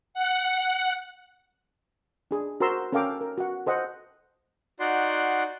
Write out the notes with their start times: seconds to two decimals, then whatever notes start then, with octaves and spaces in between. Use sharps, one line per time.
0.14 F#5
2.31 D4 G#4
2.60 F#4 A#4 C5 A#5 C6 E6
2.92 C#4 A4 A#4 F5 G5 D6
3.21 A#4
3.38 F#4 F#5
3.66 A4 C5 D#5 F#5
4.80 D#4 F#4 D5 F#5 C6